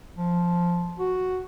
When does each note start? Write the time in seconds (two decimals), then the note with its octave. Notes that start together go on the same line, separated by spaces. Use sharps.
0.16 F3
0.99 F#4